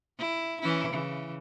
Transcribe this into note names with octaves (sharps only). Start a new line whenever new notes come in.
E4
E3 C#4 E4
C#3 E3